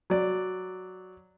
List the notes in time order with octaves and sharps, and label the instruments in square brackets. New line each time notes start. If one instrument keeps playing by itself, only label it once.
[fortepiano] F#3 D5